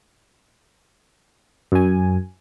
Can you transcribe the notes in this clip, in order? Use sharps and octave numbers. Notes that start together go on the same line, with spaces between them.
F#2 G#5